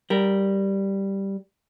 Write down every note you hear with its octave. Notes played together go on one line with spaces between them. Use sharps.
G3 A#4